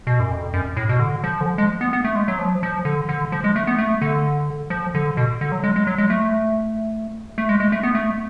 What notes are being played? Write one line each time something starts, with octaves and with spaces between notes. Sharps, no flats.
B2
F#2
F2
F#2
A2
B2
D3
F3
D3
F3
G#3
B3
B3
A3
G#3
F#3
F3
F3
D3
D3
F3
G#3
A3
B3
A3
D3
F3
D3
B2
D3
F#3
G#3
G#3
F#3
G#3
A3
A3
G#3
G#3
A3
B3
A3